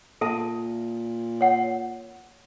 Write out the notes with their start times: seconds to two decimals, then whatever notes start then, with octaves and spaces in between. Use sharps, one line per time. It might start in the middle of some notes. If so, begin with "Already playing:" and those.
0.21 A#2 A4 E5 A5
1.41 C#5 F#5